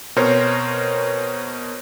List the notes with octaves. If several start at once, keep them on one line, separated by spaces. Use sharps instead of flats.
B2 C4 A#4 C5 C#5